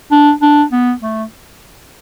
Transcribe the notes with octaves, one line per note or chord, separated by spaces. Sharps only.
D4
D4
B3
A3